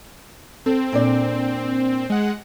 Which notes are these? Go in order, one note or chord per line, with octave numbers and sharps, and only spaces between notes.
C4 A4
A#2 D4 D5
G#3 F#5